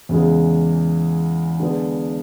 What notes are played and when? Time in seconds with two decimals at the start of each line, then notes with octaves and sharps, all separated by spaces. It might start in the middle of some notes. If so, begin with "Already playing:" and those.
0.09 E2 C#3 G#3
1.60 D3 G#3 B3